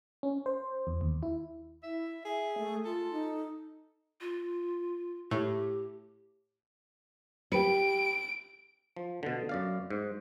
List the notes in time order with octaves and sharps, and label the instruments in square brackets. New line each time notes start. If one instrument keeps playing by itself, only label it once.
[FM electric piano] C#4
C5
E2
D#2
E4
[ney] E4 [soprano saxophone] E5
[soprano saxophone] G#4 [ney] E5
[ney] A3
[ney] F4 [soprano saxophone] A4
[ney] D#4
[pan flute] F4
[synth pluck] A2 [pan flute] G4
[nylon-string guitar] G4 B4 [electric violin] D7
[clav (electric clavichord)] F3
B2 D3
F#2 D5 F5
G#2